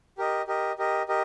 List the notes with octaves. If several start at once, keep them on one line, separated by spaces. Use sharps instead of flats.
G4 A#4 D#5
G4 A#4 D#5
G4 A#4 D#5
G4 A#4 D#5